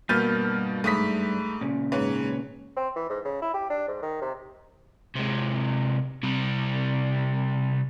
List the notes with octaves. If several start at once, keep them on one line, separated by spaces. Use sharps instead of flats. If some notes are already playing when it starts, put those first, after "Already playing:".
G2 B2 A#3 B4 F6 G6 A6 D#7
G#2 A3 B5 D#6 B6
A#2 C#3
G#2 B4 C#5
C4
E3
G#2
C#3
E4
G4
D4
G#2
D#3
C3
C3 G#3
C3 G3